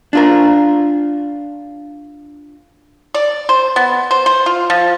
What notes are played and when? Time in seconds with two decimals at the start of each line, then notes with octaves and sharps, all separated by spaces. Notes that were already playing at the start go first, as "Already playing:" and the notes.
0.13 D4 F4 A#4
3.14 D5
3.49 C5
3.76 B3
4.11 C5
4.26 C5
4.46 F4
4.70 F3